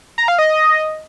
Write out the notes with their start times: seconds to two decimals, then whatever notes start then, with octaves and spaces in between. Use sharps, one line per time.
0.18 A#5
0.28 F5
0.38 D#5